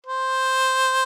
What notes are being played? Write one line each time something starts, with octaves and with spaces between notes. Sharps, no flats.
C5